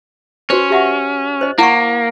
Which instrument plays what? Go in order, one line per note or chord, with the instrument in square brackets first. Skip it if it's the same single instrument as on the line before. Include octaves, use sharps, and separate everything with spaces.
[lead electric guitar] C#4 [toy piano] F#4 B4 C5
[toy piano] G4 E5 F#5
C5 D#5
[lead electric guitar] A#3 [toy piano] E4 F#5 C#6